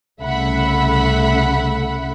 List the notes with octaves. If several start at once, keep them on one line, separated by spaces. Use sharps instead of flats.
C2 C#3 A3 E5 F#5 B5